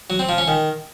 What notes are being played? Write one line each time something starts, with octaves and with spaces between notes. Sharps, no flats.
F#3
C4
F3
C#4
D#3